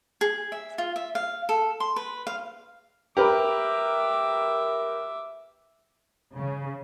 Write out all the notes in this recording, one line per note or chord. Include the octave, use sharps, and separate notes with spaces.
G#4
E5
F4
E5
F5
A4
C6
B4
F5
G4 A#4 B4 E5 D6
C#3